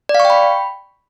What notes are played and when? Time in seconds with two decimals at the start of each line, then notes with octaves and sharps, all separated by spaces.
0.09 D5
0.14 F5
0.20 C#6
0.25 G5
0.30 B5